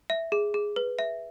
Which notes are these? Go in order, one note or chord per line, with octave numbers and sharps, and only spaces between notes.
E5
G#4
G#4
B4
E5